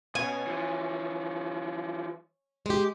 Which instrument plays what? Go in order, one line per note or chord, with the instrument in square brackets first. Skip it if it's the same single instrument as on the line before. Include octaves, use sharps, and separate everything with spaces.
[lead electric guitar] B2 [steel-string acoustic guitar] C#4 [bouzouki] G#5
[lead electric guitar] E3 F3
[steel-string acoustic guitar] G#3 G4